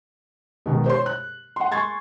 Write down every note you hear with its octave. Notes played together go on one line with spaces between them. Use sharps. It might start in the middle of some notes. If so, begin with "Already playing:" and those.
B2 D#3 G#3
C5 C#5 C6
F#6
F#5 C6
G#5 C6 C#6 G#6 A6